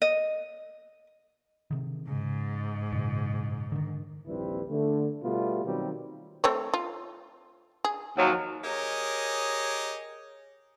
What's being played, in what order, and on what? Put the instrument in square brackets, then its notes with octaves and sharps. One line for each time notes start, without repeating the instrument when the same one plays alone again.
[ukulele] D#5
[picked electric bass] C3 D#3
[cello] G#2 [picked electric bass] C#3
[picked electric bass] F#2 A#2 C#3
D3 D#3
[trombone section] A#1 D#2 G3 C4 E4 B4
D3 A3
B2 G3 A3 B3 F4
B2 D#3 F#3 G3 A#3 C4
[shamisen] A3 C4 C#5
F4
G#4
[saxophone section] D#2 F3 F#3
[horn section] G4 G#4 A#4 C#5 D#5